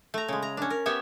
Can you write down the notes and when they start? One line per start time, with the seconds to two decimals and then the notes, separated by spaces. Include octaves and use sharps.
0.14 A3 A#5
0.28 C#3 G#3
0.42 A#5
0.57 C#4 D4
0.70 A#4
0.86 B3 G4 C#5 E5